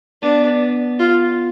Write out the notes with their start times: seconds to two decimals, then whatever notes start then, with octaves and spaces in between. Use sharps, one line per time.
0.22 B3 D4
0.99 F4